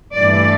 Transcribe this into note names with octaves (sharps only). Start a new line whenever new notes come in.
G2 E3 A3 D5